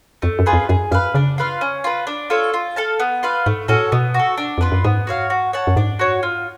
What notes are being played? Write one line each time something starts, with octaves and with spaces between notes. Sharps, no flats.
F2 A3
F#2
F4 G#4 B4
F2
F#2 G#4
F#2 B4 F5
C#3 D4
F4 B4 F5
C#4
F4 B4
D4
F4 A4 C#5
F4
A4 F5 A5
B3
F4 B4 F5
G#2 A3
A2 C#4 F#4 A4
B2 B3
F#4 A4
D4
F2 F4 B4
F#2
G#2 B3
F#4 C#5 F5
F#4
C#5 F#5 A5
F#2
G#2 D4
F#4 C#5
F4